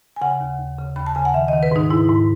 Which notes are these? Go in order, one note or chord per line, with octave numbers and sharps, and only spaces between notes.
G#5
C#3 F#5
D#2
D#2
C#3
D#2 B5
A5
C#3 G#5
F#5
D#3 E5
D#3 D#5
B4
G#2 D#4
G#2 E4
G#2